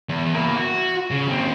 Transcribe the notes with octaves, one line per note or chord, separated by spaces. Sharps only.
E2
A#3 E4
F#4
C#3
D#2 C4